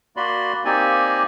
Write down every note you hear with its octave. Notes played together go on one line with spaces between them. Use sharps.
A#3 F#4 D5 B5 C6
A#3 C4 D#4 G4 D5 G#5